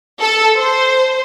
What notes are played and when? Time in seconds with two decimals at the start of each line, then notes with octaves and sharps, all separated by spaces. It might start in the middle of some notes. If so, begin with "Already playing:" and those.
0.21 A4
0.58 C5